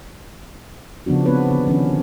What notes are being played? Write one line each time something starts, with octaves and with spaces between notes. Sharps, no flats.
C#3 F3 B3 D4 F#4
B3 C4 D4 B4 C#5
D3 B3
D#3 F3 C#4 D4